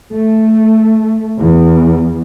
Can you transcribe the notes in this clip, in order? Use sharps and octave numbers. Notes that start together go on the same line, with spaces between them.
A3
E2